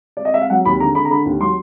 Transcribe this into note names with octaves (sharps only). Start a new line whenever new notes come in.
D5
D#5
E5
F5
F#3 F#5
D#2 B5
D3 A#5
D3 B5
A#5
D3 B5
D#2
F#3 C6